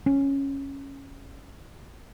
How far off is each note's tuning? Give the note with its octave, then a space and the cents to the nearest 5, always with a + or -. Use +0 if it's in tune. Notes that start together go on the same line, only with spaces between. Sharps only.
C#4 -10